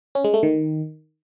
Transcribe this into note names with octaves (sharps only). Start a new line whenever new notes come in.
C#4
G#3
A3
D#3